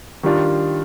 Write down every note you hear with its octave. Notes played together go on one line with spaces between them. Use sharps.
D#3 G3 D4 F4